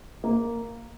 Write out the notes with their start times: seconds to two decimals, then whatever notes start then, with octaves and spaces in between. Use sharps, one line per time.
0.24 A#3